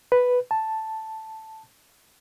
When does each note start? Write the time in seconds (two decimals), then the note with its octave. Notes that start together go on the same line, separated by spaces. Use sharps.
0.12 B4
0.51 A5